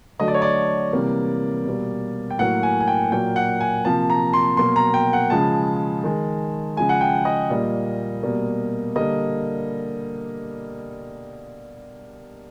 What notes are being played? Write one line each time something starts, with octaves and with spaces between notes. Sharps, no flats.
D3 F#3 A3 D#5
D5
C#5
D5
C3 E3 G3 A#3
B2 G3 A#3
G5
A2 F#3 A#3 F#5
G#5
G#5
G5
A#2 F#3 A#3 G5
F#5
G#5
C3 F3 A#3 A5
A#5
C6
B2 F#3 A#3 C6
A#5
G5
F#5
C#3 F3 G#3 A5
D#3 G#3
C#3 F3 G#3 G#5
F#5
G5
D#5
A#2 G3 A#3
B2 G3 A#3
D3 G3 A#3 D#5